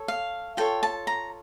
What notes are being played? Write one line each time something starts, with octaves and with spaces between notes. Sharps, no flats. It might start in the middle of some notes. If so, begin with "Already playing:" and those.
Already playing: A4 C#5
F5
F4 A4 C#5 G5
A5
A#5